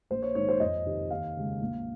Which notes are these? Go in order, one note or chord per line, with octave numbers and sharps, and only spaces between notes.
A#1 C5
C#5
G#2 D#3 C#5
C5
F2 D#5
C3 D#3
D#2 F5
C#3 G#3
A#1